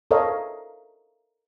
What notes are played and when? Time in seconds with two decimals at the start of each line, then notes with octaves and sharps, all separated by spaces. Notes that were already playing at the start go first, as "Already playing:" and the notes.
0.11 A4 A#4 C5 C#5 D#5 F5